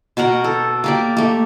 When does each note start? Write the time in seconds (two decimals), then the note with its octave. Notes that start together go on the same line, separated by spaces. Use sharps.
0.17 B2 F#4 A#4 F#5
0.44 A4
0.84 A#3 G4 D5
1.17 A3 A#3